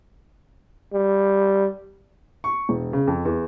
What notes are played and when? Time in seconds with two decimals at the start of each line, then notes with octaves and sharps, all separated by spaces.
0.93 G3
2.44 C#6
2.69 E1
2.93 C#3
3.07 F2
3.25 E2